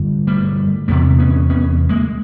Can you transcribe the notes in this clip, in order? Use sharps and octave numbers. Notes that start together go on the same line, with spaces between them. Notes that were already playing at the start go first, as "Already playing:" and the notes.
Already playing: G2 D3
G3 A3
E2 C3 A3 B3
B3 C#4
B3 C#4
G#3 A#3